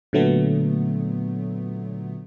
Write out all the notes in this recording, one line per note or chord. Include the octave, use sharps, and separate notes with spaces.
A#2 D3 F#3 A3 B3